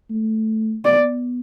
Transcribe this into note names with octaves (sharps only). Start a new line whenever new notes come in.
A3
B3 D5